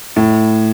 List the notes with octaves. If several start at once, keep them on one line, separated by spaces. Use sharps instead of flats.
A2